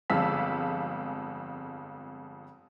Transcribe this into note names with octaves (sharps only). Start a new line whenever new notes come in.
G1 F2 G#3 F5 E6 B6